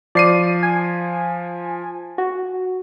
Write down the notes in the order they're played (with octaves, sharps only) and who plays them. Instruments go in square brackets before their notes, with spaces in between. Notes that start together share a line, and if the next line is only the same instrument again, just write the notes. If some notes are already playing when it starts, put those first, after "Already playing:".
[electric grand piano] F3 C7 D#7 [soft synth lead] D5
[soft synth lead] G#5
F#4